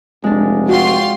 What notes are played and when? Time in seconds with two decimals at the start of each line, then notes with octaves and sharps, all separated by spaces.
0.24 F1 G#3 D4
0.69 F4 F#4 G5 C6